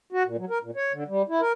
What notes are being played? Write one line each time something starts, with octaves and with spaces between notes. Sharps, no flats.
F#4
A#2
F#3
A#4
A#2
C#5
D3
G3
E4
A#4